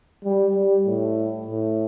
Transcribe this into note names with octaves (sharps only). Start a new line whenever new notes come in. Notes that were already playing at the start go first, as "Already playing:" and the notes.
G3
G3
A2
A2